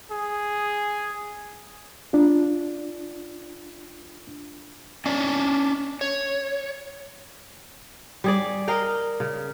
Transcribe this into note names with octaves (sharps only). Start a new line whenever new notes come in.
G#4
D4 F4
C#4 D4 D5
C#5
G3 G#4 D5
A#4 D#5 F5 G5
C#3